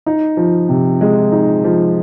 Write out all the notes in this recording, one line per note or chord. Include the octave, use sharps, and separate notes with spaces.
D#4
F3
C3
G#3
D#4
F3